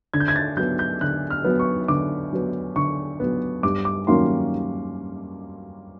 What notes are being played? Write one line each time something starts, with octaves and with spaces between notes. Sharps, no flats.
D3 G#6
G6
G#6
A6
F#3 B3 G6
G6
D3 F#6
F6
F#3 B3
C#6
D3 D6
F#3 B3
D3 C#6
F#3 B3
G2 D6
D6
D#3 F#3 A#3 C#4 C6